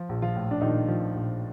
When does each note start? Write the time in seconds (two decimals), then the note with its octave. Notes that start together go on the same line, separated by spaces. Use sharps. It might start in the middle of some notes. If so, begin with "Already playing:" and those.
Already playing: F3 F4
0.09 A#1
0.22 F3 F4
0.36 A2
0.51 D4
0.61 A#1 D#3 D#4
0.88 F3
1.14 A#1